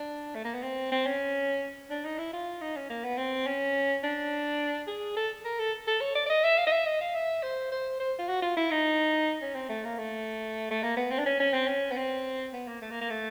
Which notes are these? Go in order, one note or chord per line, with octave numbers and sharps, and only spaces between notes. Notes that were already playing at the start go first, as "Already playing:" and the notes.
Already playing: D4
A3
A#3
B3
C4
C4
C#4
D4
D#4
E4
F4
D#4
C#4
A#3
B3
C4
C#4
D4
G#4
A4
A#4
A4
A4
C#5
D5
D5
D#5
E5
F5
D#5
E5
D#5
F5
E5
C5
C5
C5
F4
F#4
F4
E4
D#4
C#4
C4
A3
A#3
A3
A3
A#3
B3
C4
D4
C#4
C#4
C4
C#4
B3
C4
B3
A#3
A3
A#3
A#3
A3